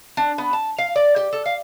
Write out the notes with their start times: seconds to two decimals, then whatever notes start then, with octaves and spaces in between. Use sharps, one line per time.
0.17 D4
0.38 B3
0.53 A5
0.78 F5
0.96 D5
1.16 G4
1.33 A4
1.46 F5